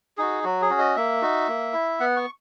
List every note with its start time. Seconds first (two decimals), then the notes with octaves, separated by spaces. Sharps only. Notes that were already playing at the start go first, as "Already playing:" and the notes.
0.18 D#4 F#4 G#4
0.44 F#3 F#4
0.62 G#4
0.70 C#4 F#4
0.78 D#5
0.96 A#3 E5
1.22 D#4 F#4
1.48 A#3
1.73 E4
2.00 B3 F#5
2.17 C#6